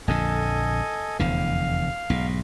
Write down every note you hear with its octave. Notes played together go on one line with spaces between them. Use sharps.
A#1 F2 D3 A4 D#5 G#5
F1 E2 D3 F5
B1 G#2